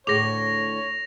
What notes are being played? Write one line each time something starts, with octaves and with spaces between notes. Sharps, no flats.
D2 A2 G#4 C#5 D6 A#6 F7